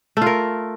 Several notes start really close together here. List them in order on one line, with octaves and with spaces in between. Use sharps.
A3 F4 A#4